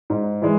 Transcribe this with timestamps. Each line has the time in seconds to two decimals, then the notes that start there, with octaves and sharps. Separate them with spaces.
0.10 G#2
0.42 E3 G#3